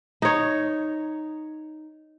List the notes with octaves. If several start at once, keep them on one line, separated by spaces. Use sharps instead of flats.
D#4 C#5